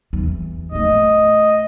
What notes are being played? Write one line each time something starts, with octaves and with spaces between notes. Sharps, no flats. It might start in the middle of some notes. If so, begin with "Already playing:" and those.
E2
A2 A3 D#5